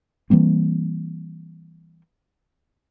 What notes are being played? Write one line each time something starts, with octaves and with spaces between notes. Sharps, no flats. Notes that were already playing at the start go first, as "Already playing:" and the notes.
E3 G3 A#3 C4